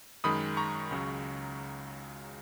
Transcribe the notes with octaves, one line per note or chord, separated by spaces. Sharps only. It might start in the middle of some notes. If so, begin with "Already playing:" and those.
F#2 D#3 G#3 B5 D#6
A#5 C#6
C#2 C#3 F#3